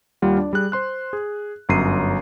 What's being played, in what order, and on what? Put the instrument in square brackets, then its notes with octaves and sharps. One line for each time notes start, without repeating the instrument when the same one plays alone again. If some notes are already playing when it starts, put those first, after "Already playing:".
[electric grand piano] D#2 G3 F4 F#5
D4 D5
G3 G#4 F#6
C5 C6 F#6
G#4
G1 F#2 A#5 C7 D#7